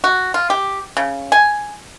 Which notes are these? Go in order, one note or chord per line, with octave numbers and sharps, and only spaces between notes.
F#4
F4
G4
C#3
G#5